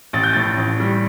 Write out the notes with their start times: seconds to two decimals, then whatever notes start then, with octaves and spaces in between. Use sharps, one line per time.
0.13 A1 A6
0.23 G6
0.33 A2 A6
0.57 A1
0.80 G3